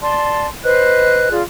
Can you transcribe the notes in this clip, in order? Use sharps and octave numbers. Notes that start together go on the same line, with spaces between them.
D5 A5 C6
B4 C5 D#5 F#6
F4 G#4 D5